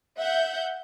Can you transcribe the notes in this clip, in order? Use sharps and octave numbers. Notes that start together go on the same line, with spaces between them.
E5 F#5 G6